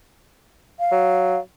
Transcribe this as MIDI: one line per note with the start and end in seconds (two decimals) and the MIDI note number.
0.79 1.39 77
0.92 1.38 54